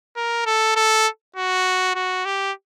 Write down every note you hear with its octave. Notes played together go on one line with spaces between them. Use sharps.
A#4
A4
A4
F#4
F#4
G4